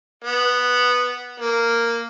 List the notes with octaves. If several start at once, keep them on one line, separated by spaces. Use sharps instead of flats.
B3
A#3